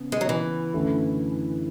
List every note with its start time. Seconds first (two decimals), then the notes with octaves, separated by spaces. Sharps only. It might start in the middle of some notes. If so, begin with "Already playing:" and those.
Already playing: C#3 B3
0.12 G#3
0.21 F#3
0.29 E3
0.74 F#2 D3 A3 E4